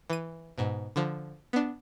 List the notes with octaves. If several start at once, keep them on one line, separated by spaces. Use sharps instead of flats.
E3 D#7
G#2 B2
D3 F3
B3 D4